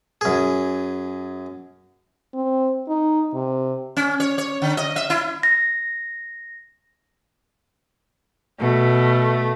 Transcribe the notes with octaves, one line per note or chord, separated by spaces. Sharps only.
F#2 G#4
C4
D#4
C3
C#4
C#5
C#5
D3
D#5
E5
E4
A#6
B2 A3